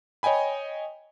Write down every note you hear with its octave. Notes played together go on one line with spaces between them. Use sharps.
C#5 D#5 G5 G#5 B5